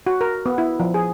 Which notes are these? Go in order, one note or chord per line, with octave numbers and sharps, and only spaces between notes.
F#4
A#4
B3
E4
F3
G#4